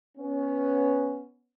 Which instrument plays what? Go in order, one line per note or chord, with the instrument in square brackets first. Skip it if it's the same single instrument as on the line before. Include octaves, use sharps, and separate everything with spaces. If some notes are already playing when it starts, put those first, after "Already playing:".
[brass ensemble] B3 C#4